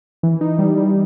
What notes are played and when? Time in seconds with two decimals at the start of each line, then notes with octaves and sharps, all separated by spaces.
0.23 E3
0.41 D#4
0.59 G3
0.77 G3